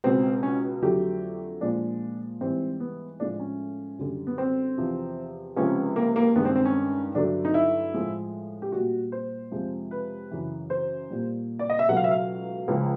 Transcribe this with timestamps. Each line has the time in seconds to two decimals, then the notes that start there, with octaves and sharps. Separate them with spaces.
0.04 C#2 B2 G#3 C4
0.43 C#4
0.82 F2 D3 F#3 A3 G4
1.61 A#2 F3 G#3 D4
2.41 G#2 E3 G3 C4
2.80 B3
3.20 A2 F3 G#3 D4
3.40 C#4
3.99 F#2 D3 G3
4.27 B3
4.38 C4
4.78 E2 C3 F3
5.57 C#2 C3 F3 G#3 C#4
5.96 A#3
6.16 A#3
6.36 G2 D#3 G#3 B3
6.45 C4
6.56 C4
6.65 C#4
7.14 G2 D3 F#3 A3 D4
7.45 D#4
7.54 E4
7.94 A2 F3 G#3
8.62 G4
8.72 A#2 G3 F#4
9.12 C5
9.51 F2 C3 F3 G#3
9.91 B4
10.31 F#2 C#3 E3
10.70 C5
11.10 A#2 G3
11.59 D5
11.70 D#5
11.79 E5
11.89 C#2 B2 F#3 A3 F#5
11.97 F5
12.04 E5
12.11 F5
12.68 C#2 C#3 F3 G#3